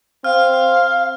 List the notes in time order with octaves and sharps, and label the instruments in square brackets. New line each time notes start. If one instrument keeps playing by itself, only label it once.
[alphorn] C4 [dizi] F5 [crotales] F6